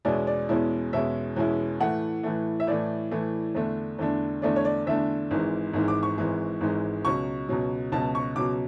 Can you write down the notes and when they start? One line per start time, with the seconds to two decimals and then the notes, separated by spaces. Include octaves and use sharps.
0.05 E2 B2 G#3 C#4 E4 D5
0.27 D5
0.49 E2 B2 G#3 C#4 E4
0.93 E2 B2 G#3 C#4 E4 E5
1.36 E2 B2 G#3 C#4 E4
1.80 A2 E3 A3 F#5
2.23 A2 E3 A3
2.60 E5
2.67 A2 E3 A3 D5
3.11 A2 E3 A3
3.55 E2 D3 A3 D4
3.99 E2 D3 A3 D4
4.42 E2 D3 A3 D4 D5
4.56 C#5
4.65 D5
4.86 E2 D3 A3 D4 E5
5.31 G#1 G#2 E3 G#3
5.73 G#1 G#2 E3 G#3
5.88 D6
6.03 C#6
6.18 G#1 G#2 E3 G#3
6.61 G#1 G#2 E3 G#3
7.05 C#2 B2 F#3 C#6
7.49 C#2 B2 F#3
7.92 C#2 B2 F#3 A5
8.15 C#6
8.36 C#2 B2 F#3 D6